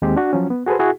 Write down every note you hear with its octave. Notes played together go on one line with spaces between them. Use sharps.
D#2 G#3 C4 G4
D4 F#4
F3 F#3 C#4
B3
F#4 G#4 A4 B4 C5
E4 F#4 G#4